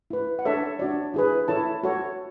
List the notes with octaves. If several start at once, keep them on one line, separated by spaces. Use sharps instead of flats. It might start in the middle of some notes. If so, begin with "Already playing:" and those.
E4 B4
F#5
D4 A4 C#5 E5
D4 F#4 C#5 D5
E4 G#4 B4
E4 A4 C#5 A5
F#4 A4 C#5